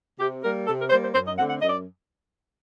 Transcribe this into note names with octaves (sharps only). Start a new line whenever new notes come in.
C3 G4
G3 A#3 A#4
C3 A4
A#4
G3 A#3 C5
C5
F#2 C5
D#5
D3 A3 C4 F#5
F#5
F#2 D#5
D5